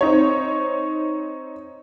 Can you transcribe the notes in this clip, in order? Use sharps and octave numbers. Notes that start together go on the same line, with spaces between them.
C4 D#4 C#5